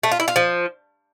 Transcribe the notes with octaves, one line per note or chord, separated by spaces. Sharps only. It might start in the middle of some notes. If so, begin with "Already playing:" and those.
A3
F4
E4
F4
F3